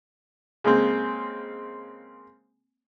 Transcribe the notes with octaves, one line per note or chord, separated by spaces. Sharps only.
C#3 G#3 A#3 C4